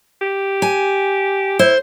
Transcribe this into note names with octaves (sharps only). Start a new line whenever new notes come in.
G4
G#5
E4 C5